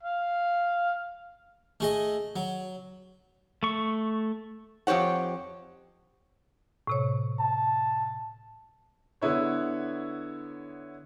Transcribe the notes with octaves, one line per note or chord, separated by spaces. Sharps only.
F5
A3 G#4 D#5
F#3
A3 C#6
F2 G4 C5 C#5 F#5
A2 C3 C#5
A5
D3 B3 E4 C#5